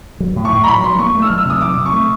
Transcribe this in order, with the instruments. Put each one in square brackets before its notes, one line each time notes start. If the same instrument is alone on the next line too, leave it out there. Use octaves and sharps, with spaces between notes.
[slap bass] F#3
A2
[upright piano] C#6
[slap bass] A2
[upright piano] A#5
[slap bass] F#3 [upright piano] B5
[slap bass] F#3 [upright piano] C6
[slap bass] A#3 [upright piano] C#6
[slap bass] A3
[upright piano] E6
[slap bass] F#3 [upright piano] F6
[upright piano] E6
[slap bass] C3 [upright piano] D#6
[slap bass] F#3 [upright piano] D6
[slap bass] C3
[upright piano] C#6
[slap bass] A3